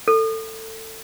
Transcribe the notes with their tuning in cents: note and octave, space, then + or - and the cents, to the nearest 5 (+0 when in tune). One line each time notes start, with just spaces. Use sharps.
A4 +20